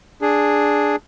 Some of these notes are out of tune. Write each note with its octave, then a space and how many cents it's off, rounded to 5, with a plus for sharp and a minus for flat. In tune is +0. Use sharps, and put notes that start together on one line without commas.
D4 +0 G#4 +0